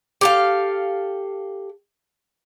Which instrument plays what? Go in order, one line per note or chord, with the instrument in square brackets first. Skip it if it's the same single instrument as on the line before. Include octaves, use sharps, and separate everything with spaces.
[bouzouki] G4 A4 F5